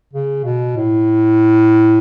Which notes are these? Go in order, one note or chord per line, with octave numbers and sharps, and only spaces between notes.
C#3
B2
A2